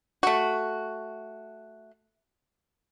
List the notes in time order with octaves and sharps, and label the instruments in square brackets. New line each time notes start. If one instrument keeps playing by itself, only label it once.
[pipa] A3 F#4